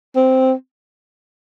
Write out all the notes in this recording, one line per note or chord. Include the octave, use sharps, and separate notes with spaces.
C4